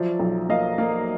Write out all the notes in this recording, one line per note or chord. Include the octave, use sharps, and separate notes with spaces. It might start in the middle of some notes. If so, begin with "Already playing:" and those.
Already playing: F3 F#3 D5 E5
B1
A#3 D#5 F5
A#3